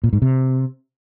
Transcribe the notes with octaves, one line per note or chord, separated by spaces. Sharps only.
A#2
G#2
C3